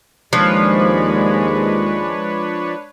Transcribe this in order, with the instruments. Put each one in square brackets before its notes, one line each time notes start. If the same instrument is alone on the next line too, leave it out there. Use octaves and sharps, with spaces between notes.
[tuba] D#2 [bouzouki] F3 [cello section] G#3 [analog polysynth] D4 B4 C#5